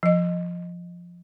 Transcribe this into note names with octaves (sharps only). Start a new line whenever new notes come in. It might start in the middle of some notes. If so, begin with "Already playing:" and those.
F3 D#5